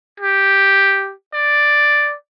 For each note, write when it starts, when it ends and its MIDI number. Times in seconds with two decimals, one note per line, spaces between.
0.20 1.12 67
1.33 2.14 74